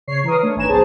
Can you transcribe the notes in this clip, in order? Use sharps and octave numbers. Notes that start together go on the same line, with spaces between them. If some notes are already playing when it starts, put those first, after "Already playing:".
C#3 C#5 C7
E3 A#4 B4 D#6
A3 D4 C#5
G#1 B4 G#5 A#5 E7
B1 G#4 C5 C#5 A5